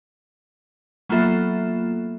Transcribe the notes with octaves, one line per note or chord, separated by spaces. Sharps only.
F#3 A#3 B3 F4 A4 E5